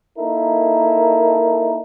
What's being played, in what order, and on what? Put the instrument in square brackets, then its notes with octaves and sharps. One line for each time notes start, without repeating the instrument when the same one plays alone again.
[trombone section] A#3 D#4 E4 A4 A#4